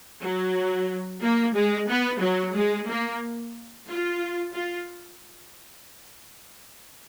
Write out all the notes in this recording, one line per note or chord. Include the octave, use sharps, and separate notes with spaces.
F#3
A#3
G#3
B3
F#3
G#3
A#3
F4
F4